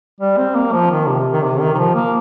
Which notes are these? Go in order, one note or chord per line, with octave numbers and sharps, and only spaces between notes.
G3
C4
A#3
F3
D#3
C3
D#3
C3
D#3
D#3
F3
A#3